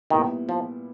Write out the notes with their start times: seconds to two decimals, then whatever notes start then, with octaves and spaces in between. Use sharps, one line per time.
0.10 A#2 D#3 G3 B3 E4
0.49 F3